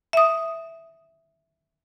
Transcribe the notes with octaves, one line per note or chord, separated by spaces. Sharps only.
E5 D#6